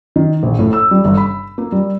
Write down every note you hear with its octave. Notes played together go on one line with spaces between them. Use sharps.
D#3
A#1
A2
E6
G3
G1
B5
A#3
G3